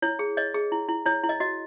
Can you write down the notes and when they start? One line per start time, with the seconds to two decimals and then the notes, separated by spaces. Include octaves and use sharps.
0.02 E4 C#5
0.19 G#4
0.37 C#5 D#5
0.54 G#4
0.72 E4
0.89 E4
1.06 E4 C#5
1.24 E4
1.29 D#5
1.40 F#4 D#5